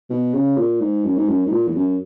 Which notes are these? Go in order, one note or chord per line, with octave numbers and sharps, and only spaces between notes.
B2
C#3
A#2
G#2
F#2
G#2
F#2
G#2
A#2
E2
F#2